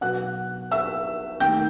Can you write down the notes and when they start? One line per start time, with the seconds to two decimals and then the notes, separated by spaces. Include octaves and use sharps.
0.01 B2 F#3 B3 F#5 F#6
0.71 E5 E6
1.40 D#2 D#3 A3 D#4 G5 G6